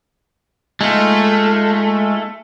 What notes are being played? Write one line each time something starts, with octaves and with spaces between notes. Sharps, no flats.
G#3 A3 D#4 F4